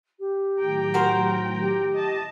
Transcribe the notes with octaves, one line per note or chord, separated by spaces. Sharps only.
G4
A2 D#3 F#3 G5 A#5
F#4 A#4 C5
G4
D#5 E5 A5